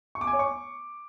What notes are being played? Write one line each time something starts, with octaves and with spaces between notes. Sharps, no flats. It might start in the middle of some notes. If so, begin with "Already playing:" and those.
C#6
D6
G#5
C#5
C#6